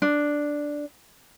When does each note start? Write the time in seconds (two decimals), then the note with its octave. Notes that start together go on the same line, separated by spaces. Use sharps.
0.02 D4